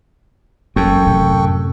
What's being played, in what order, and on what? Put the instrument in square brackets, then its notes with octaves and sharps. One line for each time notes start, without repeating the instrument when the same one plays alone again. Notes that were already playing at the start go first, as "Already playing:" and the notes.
[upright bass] F#1 [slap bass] F#2 [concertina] A4 G5 C#6
[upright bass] A2 C3